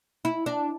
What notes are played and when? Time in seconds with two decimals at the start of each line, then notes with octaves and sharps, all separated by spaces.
0.25 E4
0.46 D4